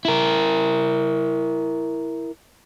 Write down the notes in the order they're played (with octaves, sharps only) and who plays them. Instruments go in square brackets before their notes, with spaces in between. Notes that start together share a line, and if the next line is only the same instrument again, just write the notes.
[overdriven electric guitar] E4 A#4